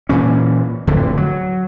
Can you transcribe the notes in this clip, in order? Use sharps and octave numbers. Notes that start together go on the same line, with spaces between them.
A#2 E3 C#4
D1 F2 D3 E3
F#3